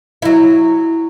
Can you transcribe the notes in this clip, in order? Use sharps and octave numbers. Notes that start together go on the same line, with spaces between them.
F#3 E4